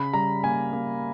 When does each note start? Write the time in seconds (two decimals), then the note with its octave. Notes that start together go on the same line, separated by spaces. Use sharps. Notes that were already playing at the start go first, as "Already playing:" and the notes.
Already playing: C#3 B5
0.13 G3 A#5
0.43 A#3 G#5
0.73 A#3